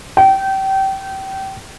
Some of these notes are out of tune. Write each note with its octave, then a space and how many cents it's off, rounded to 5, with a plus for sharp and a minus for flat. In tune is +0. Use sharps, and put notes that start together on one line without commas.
G5 -25